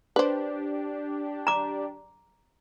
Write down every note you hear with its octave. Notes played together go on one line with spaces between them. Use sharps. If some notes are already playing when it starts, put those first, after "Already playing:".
D4 G4 B4 C5
A#5 D6